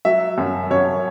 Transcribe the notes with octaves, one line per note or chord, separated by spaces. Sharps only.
F#3 E5
F#2
F#2 C#5